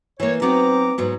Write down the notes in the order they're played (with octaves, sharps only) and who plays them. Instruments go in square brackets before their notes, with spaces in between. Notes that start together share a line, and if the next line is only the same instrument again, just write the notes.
[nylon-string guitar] E3 A#3 [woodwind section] C#5
[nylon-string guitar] F#3 B3 D#4 [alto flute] C4 [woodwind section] A#5 D6
[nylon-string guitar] G#2 F#3 B3